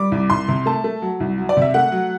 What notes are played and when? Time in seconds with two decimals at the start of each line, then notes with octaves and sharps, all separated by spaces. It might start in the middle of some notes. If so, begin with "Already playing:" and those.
Already playing: G3 D6
0.12 C2
0.30 C2 C6
0.48 C3
0.66 A3 A5
0.84 A3
1.02 F#3
1.20 C2
1.38 F#3
1.49 D5
1.57 C3 E5
1.74 A3 F#5
1.92 F#3